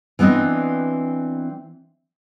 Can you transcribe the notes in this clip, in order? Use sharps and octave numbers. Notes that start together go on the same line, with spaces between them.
E3 B3 C4 D4 D#5